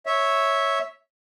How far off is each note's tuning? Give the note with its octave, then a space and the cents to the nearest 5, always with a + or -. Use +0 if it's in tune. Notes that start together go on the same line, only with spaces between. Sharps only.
C#5 +0 E5 -10